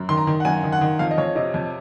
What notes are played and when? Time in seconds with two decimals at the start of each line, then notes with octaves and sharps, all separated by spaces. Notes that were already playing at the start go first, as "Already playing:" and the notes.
Already playing: F#2
0.09 D#3 C6
0.17 A#5
0.27 D#3
0.40 F#5
0.45 F#2 G#5
0.64 D#3
0.72 F#5
0.81 D#3
0.99 F2 F5
1.11 D#5
1.18 F2 C#5
1.35 C3 D#5
1.54 F2